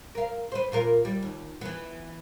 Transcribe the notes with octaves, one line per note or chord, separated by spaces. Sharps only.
A#4 F5
B4 C5
A#2 F4 A#4
G3
D#2
E3 B3